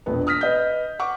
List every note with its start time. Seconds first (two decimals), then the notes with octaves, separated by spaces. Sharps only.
0.06 E1 A#1 B3
0.27 D#6 F6 A#6 B6
0.41 B4 D#5 G6
0.99 F#5 C#6 D6